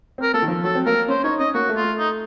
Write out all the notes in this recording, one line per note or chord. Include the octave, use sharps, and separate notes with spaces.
C4 A#4
A#3 A4
D#3
F3
F#3 A4
C4
A#3 A#4
C#4 C5
D#4 C#5
C#4 D#5
A#3 F#4
A3
F4
A3
D#4